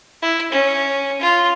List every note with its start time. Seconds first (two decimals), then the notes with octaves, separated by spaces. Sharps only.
0.22 E4
0.52 C#4
1.21 F4